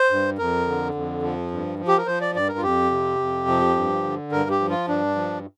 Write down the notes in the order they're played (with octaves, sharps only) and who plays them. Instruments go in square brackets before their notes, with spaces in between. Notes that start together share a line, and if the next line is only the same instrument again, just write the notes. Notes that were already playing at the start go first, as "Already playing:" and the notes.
Already playing: [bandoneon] C5
G2
F2 A#4
D3
F2
F3
G2
F3
G4
A#4
F3 C5
D5
G2 D5
A#4
F4
F2 G4
C3
F2
F3
G2
D3
G2 A#4
G4
F3
F4
G2 D4
F3